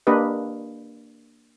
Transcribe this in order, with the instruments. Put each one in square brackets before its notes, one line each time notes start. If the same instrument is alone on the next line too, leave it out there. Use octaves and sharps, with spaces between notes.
[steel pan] A#3 D4 G4 B4 D#5